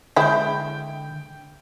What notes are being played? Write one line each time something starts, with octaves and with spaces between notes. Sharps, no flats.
D3 G#3 E4 G5 G6